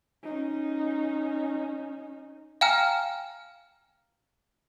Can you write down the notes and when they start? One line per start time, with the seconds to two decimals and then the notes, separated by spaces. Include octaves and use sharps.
0.23 C#4 D#4
2.61 F5 G5 G#5 A#5 F6